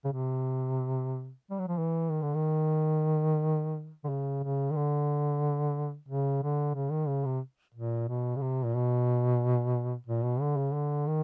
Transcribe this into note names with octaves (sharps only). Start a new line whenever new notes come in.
C#3
C3
G3
F#3
F3
E3
D#3
D3
D#3
D3
C#3
C#3
D#3
D3
C#3
D3
C#3
D#3
C#3
C3
A#2
B2
C#3
C3
A#2
B2
A#2
B2
D3
C#3
D3
D#3